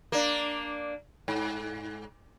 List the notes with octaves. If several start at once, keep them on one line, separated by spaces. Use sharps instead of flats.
A#3 D4
G#2